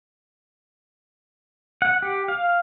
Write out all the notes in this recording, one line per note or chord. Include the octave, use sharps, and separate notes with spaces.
F#5
G4
F5